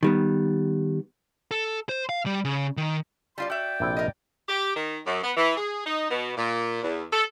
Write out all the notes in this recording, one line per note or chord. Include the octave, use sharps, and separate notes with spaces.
D#3 G3 B3
A4
C5
F5
G3
C#3
D#3
G3 F4 D5 A5 C6
F#4 D5 E5 G5
A#1 C3 E4
A#4 D#5
G4
D#3
F#2
B3
E3
G#4
D#4
B2
A#2
E2
A4